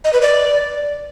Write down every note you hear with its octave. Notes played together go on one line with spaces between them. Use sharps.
D#5
B4
D5